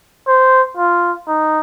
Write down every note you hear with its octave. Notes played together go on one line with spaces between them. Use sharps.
C5
F4
D#4